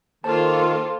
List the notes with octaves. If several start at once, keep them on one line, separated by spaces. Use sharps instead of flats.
D#3 A#3 F4 A4 C5 A5